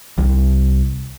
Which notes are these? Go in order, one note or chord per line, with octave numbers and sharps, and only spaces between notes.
C2